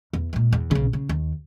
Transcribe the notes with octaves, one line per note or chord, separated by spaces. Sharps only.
E2
A#2 G#3
E2
B1 C#3
C#3
D#2